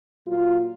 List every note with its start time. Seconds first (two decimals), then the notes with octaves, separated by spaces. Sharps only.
0.26 A#2 F#3 F4